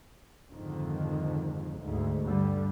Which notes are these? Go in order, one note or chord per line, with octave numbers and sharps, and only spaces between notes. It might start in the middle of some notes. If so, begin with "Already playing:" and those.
F2 G#2 D3 D#3
D2 G#2
G2 D3 G3